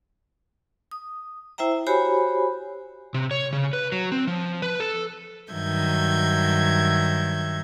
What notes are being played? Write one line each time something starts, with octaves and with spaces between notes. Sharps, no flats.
D#6
E4 C5 E5 G5 A#5
F#4 G4 C5 C#5 G#5 B5
C3
C#5
C#3
B4
F#3
C4
F3
B4
A4
G2 D#3 F#3 E5 G6 G#6